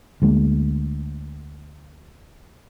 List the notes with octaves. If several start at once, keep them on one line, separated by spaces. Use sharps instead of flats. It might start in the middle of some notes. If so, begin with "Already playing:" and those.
D2 G#3 A#3